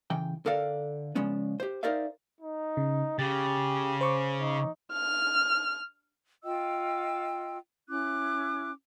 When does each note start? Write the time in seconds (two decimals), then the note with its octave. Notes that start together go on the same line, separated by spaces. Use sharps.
0.10 C#3 E3 G5
0.46 D3 A4 A#4 D5 F5
1.15 C#3 F3 G#3 B3 C#4 D4
1.60 G4 C5
1.83 D#4 A#4 C5 D5 E5 F5
2.40 D#4
2.77 C#3
3.19 C#3 G4 A6
4.01 C5 C#6 D6
4.40 D#4
4.92 F6
6.44 F4 D#5 G5 E6
7.89 C#4 E4 D6 F#6